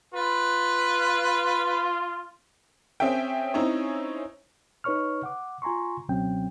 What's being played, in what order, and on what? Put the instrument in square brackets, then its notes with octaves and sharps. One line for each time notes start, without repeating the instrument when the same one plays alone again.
[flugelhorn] F4 [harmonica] B4
[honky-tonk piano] C4 C#4 G#4 E5 G5
C4 C#4 D#4 E4 C#5
[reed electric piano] D#4 B4 C#5 C#6 F6
F#5 D6
F4 G#5 A#5 C6 C#6
C#2 B2 F#3 C4 C#4 G5